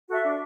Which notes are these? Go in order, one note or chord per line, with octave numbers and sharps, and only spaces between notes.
F#4 A4 E5
D4